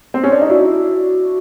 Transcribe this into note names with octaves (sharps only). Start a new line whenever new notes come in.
C4
C#4
D4
D#4
D4 E4 F#4